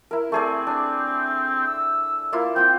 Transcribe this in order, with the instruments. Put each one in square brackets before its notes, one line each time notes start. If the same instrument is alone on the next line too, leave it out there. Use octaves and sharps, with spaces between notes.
[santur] E4 A#4
[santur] A3 G#4 D5 [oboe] C4
[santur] D4
[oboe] E6
[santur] A#3 E4 F4
[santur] C4 F4 [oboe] G5